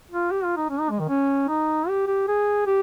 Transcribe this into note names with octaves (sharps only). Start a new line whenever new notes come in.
F4
G4
F4
D#4
C#4
D#4
G#3
D#3
C#4
D#4
G4
G4
G#4
G4